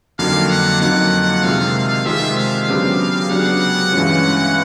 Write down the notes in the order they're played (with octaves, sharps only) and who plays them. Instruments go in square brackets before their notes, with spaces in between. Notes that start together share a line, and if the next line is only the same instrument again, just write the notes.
[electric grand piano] F2 D3 F#3 A#3 D#4 [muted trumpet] F5
[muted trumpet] F#5
[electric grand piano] F2 D3 F#3 A#3 D#4 [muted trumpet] F#5
[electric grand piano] C3 D#3 G#3 C4 F4 [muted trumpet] F5
[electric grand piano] C3 D#3 G#3 C4 F4 [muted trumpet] E5
[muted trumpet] F5
[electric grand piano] C#3 F#3 B3 D4 G4
[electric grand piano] C#3 F#3 B3 D4 G4 [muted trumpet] F#5
[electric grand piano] G2 E3 G#3 C#4 F4